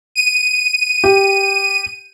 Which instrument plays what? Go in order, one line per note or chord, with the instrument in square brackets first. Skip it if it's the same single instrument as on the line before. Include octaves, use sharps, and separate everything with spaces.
[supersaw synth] D#7
[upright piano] G4